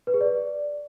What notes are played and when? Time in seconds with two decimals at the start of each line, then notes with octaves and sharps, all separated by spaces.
0.07 B4
0.14 G#4
0.21 D5